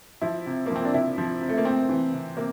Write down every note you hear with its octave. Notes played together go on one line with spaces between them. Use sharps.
F3 E4
C3
F3 A#3
C4
D4
C3 E4
F3
C3
A3
A#3
C3 C4
E3
C3
C3 A#3